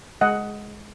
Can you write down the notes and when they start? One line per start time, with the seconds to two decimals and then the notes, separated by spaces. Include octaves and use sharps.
0.21 G#3 D#5 F#5